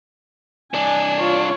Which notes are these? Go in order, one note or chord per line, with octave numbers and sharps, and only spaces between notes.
C2 D4 G#5
F4 C#5